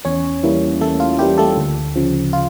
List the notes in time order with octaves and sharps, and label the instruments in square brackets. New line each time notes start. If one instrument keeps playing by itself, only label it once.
[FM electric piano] E2 C#4 C#5
E3 G3 A#3 E4
E2 A3 A4
F4
E3 G3 A#3 E4 G4
A3 A4
D2
C#3 F3
F4